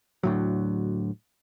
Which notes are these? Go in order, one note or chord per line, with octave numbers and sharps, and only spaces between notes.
D2 A2 F#3